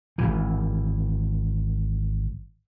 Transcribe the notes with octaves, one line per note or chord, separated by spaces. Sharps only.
G#1 C#2 E3